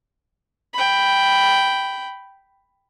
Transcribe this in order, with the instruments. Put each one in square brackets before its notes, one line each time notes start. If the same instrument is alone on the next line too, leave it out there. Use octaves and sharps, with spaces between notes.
[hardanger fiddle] G5 B5